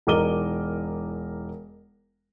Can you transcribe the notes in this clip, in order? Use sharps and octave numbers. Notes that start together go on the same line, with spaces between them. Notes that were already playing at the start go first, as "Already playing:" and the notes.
E1 D#4 A#4 D6 D#7 G7